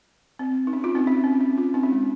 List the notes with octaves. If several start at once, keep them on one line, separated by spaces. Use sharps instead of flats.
C4
D#4
C#4
C#4 F4
C4 D#4
C#4
C#4
C4
C#4
C#4 F4
C4 D#4
C#4
G#3